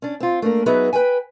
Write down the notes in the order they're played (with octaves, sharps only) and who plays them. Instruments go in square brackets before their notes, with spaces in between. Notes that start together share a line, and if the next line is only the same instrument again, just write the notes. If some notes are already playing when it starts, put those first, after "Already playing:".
[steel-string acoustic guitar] C#4 D4
C4 F4
A3 A#3 D4 A#4
F#3 B3 D#4 G#4 B4 E5
B4 C5 G5 G#5